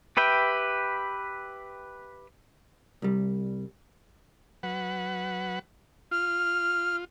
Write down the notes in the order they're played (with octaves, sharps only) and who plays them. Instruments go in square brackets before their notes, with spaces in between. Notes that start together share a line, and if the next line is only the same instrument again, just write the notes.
[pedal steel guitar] G4 B4 E5 G5
[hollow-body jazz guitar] C2 G3
[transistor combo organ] F#3 B4 F#5
[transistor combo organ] F4 [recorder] F6